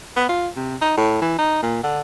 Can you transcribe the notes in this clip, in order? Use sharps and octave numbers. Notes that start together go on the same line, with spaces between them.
B3
F4
C3
D#4
A2
E3
D#4
A#2
D3